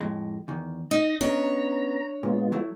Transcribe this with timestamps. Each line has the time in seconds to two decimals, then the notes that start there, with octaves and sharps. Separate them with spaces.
0.01 F2 A2 G#3
0.48 E2 D#3
0.91 D#4 D#5 A#6
1.21 B3 C#4 D4 C#5 D#5 A#5
2.23 A#2 G#3 B3 F4
2.52 F#3 A3 E4